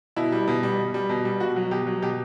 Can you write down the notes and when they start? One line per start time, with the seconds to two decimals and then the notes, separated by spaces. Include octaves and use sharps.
0.16 B2 E4
0.32 G3
0.48 B2
0.63 G3
0.79 B2
0.94 G3
1.09 B2
1.25 G3
1.40 B2 F#4
1.56 F#3
1.71 B2 G4
1.87 F#3
2.02 B2 G4